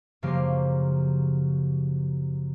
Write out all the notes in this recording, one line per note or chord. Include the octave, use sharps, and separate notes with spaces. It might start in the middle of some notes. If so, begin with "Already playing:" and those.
F#2 C#3 F3 A#3 G4 C6